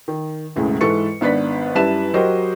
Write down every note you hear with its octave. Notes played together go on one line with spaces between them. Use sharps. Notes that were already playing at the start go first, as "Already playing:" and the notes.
D#3
E1 E2 A2 C#3 G#3
G#2 E3 A4 B4 C#6 C#7
G#1 B3 D4 B4 B6
F#2 G3 E4 B4 A5 E7
F#3 F#4 G4 A#4 C5 D#5